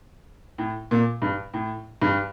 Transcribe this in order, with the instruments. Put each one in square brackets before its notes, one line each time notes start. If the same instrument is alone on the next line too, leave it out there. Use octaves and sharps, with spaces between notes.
[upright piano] A2
A#2
G2
A2
G2